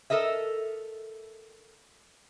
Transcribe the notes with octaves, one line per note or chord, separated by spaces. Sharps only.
A4 A#4 D#5 E5